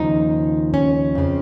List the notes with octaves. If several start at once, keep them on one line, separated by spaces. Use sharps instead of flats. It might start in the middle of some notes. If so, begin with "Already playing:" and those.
Already playing: D#2 C#3 F3 D#4
C#4
F2 C#3 F3